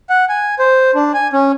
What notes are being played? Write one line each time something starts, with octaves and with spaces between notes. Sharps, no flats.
F#5
G#5
C5
D4
G#5
C#4